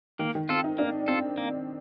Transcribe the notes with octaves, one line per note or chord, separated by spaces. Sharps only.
D#3 A#3
D#3
C4 F4 A4
D#4
A#3 D4
C4 F4 A4
A#3